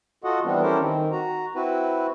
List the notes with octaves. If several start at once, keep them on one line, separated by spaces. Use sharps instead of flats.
F4 F#4 A4 D#5 F#5
E3 G3 B3 C4 D4
C#4 E4 G4 A4 A#4 C5
D#3 C4
F#4 A#5
C4 E4 F#4 B4